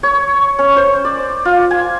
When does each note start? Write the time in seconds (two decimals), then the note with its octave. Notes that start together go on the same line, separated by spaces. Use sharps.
0.03 C#5
0.59 C#4
0.76 C5
1.05 D5
1.45 F4
1.71 G#5